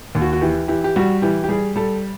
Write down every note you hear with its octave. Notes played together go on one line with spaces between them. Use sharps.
D#2
F#4
F#4
E3 G4
E3 G4
G4
G3 F#4
E3 G4
G4
G3 G#4
G3 A4